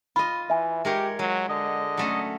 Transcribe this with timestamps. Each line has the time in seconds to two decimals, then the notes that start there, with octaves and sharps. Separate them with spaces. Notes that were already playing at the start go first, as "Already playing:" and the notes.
0.16 F4 D#5 B5
0.50 E3 E5 G#5
0.85 G#3 G4 A#4 C#5
1.19 F#3 G#3
1.49 D3 D#5
1.97 F#3 A3 C#4